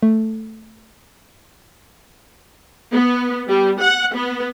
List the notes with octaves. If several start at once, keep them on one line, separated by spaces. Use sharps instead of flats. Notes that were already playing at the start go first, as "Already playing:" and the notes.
A3
B3
G3
F#5
B3